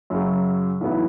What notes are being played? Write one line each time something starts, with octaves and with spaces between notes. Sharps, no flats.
F#2 C#3 F#3
B1 A2 E3 B3 E4